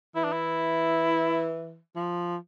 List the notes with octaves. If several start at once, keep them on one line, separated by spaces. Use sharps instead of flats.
E3 E4
D4
E4
F3